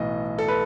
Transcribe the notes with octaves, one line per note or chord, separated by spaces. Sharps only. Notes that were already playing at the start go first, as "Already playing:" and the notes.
Already playing: B1 A2 E3 D#5
A4
B4